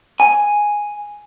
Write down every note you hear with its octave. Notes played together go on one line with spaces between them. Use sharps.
G#5